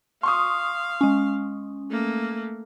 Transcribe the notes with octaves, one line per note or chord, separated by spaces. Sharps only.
F5 C6 C#6 D#6
G#3 C#4
A3 A#3